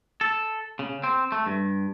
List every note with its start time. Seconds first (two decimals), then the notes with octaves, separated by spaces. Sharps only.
0.21 A4
0.79 C#3
1.04 C4
1.32 A3
1.46 G2